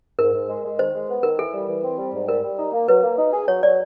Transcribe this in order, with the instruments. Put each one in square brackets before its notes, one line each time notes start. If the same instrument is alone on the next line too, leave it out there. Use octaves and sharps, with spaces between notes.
[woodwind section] G#2 [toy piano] A#4
[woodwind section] G#2
G#3
G#3
[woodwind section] D#3 [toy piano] C5
[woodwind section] G#3
B3
[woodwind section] D#3 [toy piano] A#4
[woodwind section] E3 [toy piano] A4
[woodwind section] G3
E3
C4
G3
G#2
[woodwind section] G3 [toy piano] A#4
[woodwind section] G3
D#4
A#3
[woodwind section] F#3 [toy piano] B4
[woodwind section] A#3
D#4
G#4
[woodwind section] F#3 [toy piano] C#5
[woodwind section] F#3 [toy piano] D5